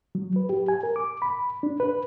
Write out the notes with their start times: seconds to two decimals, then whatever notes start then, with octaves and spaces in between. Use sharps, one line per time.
0.15 F#3
0.36 B4
0.49 G4
0.68 G#5
0.83 A#4
0.96 D6
1.22 B5
1.63 D4
1.80 B4